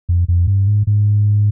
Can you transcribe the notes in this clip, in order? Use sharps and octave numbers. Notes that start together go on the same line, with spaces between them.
F2
F2
G2
G#2
G#2